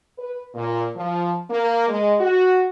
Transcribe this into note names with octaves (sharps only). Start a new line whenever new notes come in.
B4
A#2
F3
A#3
G#3
F#4